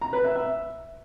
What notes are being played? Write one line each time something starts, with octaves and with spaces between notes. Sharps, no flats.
A#5
B4
E5
E5